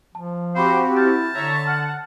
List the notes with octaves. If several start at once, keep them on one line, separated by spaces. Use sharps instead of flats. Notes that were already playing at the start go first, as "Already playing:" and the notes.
F3 A5
C4 F#4 G4 C5 F5 B5 D6
E4 A5 F6 G6
D3 C#5 E5 A#5
F#5 F6